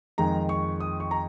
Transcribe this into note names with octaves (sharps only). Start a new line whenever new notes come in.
F2 D#3 G#3 A#5
C#6
D#6
C#6
A#5